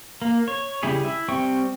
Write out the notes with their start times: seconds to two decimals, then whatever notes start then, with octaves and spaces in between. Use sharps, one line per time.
0.22 A#3
0.48 C#5
0.83 C#3 G3 E4 G4 G#4
1.05 E4 E5
1.28 G3 C4 G5 C#6 D#6